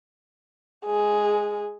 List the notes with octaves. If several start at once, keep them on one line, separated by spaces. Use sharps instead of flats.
G#3 G#4